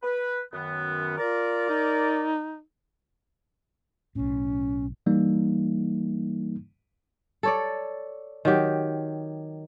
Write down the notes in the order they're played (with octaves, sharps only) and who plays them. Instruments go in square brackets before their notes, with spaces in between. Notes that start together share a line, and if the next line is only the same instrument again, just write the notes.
[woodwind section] B4
F#2 D#3 B3
[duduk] F4 [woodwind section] A#4 D5
[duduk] D#4
[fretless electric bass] B1 A2 [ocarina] C#4
[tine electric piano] E3 G3 A#3 D#4
[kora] A4 C#5 D5
D#3 F#3 G4